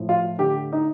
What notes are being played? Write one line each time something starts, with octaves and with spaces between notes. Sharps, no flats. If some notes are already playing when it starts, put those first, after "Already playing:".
Already playing: A2 F3
F4
D3 G4
D#4